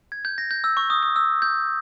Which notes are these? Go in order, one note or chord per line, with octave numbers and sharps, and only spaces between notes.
G#6
G6
A#6
G6
E6
C#6
D#6
D#6
E6
G6